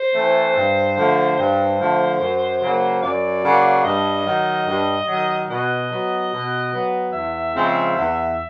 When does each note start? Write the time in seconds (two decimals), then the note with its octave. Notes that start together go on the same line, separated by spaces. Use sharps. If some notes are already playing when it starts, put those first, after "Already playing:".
Already playing: C5
0.14 E3 A3 C4
0.55 G2
0.96 D3 F3 A3
1.37 G2 C5
1.78 D3 F3 A3
2.19 F#2
2.60 C#3 F#3 A#3
3.01 F#2 D5
3.43 C#3 F#3 A#3
3.84 G2 D#5
4.25 D#3 F#3
4.66 G2
5.08 D#3 F#3
5.48 B2 D#5
5.90 F#3 B3
6.31 B2
6.72 F#3 B3
7.12 E2 E5
7.53 C#3 F3 G#3 C4
7.95 E2